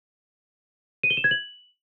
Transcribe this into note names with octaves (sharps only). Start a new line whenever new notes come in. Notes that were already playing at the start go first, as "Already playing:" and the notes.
D#7
G7
E7
G#6
F#7